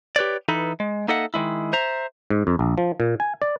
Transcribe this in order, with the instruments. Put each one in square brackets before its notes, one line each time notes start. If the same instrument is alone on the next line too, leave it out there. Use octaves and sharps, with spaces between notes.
[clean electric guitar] G4 B4 C#5 D5
E3 D#4 A4 B4
G#3
A#3 D#4 A4 D#5 E5 F#5
D#3 F3 G#3 E4
C5 E5 A#5
[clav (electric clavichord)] G#2
F2
A#1
F3
A#2
G#5
D5